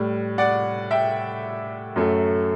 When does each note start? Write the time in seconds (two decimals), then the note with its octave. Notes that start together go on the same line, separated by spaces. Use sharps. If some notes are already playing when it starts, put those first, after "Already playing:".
Already playing: A2 G3
0.38 D5 F#5
0.91 E5 G5
1.96 F#2 F#3 A3